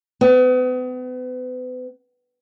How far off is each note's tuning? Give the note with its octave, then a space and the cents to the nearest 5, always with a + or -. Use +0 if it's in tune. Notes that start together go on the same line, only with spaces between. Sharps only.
B3 +40